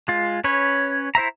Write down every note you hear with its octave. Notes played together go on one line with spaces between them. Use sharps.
G#3 F4
C#4 B4 C#5
E4 C5 E5 A#5